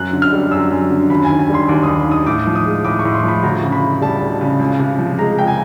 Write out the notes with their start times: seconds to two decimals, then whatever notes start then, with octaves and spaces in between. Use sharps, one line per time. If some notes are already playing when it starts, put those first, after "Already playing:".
Already playing: F#2 F#6
0.13 D3
0.22 F6
0.33 G3
0.51 F#2 E6
0.71 F#2
0.91 D3
1.10 D#2 B5
1.24 D#3 G#5
1.39 G#5
1.49 G3 C6
1.68 D#2 D6
1.83 D#2 D#6
2.07 D#3 D#6
2.26 A2 D6
2.47 F3
2.55 D#6
2.66 G#3
2.85 A2 D6
2.99 C#6
3.05 A2
3.14 C6
3.23 F3 B5
3.43 D2 A#5
3.63 C#3
3.72 B5
3.83 E3
4.02 G3 A5
4.21 D2
4.41 C#3
4.60 C#2
4.79 C3
4.98 F3
5.19 G#3 A#5
5.39 C#2 G5
5.47 G#5